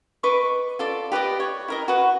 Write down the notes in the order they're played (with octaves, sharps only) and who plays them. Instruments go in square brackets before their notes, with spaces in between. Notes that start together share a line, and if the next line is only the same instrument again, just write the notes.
[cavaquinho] B4 D#5 C#6 D6
F4 A4 D5
G4 B4 D5 D#5
C#5
E4 A#4 D#5
F#4 B4